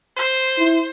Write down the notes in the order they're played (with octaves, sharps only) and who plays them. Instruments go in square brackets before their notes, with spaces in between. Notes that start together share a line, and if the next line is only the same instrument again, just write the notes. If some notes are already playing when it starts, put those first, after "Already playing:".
[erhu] C5
[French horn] E4